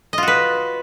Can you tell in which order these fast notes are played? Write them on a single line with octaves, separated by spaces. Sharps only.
D#5 F4 F#4 B4